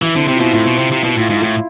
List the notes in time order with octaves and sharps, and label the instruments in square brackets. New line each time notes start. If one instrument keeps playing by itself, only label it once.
[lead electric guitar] E3 [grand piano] E4
[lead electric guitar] D3 [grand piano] C4
[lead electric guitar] C3 [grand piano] C4
[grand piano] F4
[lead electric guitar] B2 [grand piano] E4
[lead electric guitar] A2 [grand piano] F4
[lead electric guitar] B2
C3
C3
[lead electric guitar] B2 [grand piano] E4
[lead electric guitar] A2 [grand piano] F4
[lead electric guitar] G#2 [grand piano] E4
[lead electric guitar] A2 [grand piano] E4